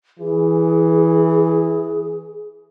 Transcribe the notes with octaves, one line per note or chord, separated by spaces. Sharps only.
E3 G#4